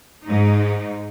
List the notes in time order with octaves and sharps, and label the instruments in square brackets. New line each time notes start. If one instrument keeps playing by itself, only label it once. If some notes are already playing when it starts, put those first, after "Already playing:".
[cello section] G#2 D#4